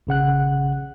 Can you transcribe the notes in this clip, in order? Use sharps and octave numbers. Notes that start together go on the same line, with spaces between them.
A#1 C#3 F#5 F#6